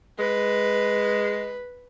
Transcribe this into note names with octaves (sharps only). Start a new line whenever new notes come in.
G#3 B4